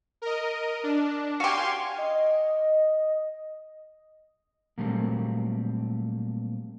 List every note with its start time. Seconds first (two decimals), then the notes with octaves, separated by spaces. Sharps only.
0.22 A#4 D#5
0.83 D4
1.40 F#4 G4 F5 G#5 C6
1.98 D#5
4.78 A#2 F#3 G3 A3 A#3 C4